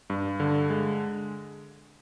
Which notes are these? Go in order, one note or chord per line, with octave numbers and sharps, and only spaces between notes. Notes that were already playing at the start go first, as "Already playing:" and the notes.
G2
D3
G#3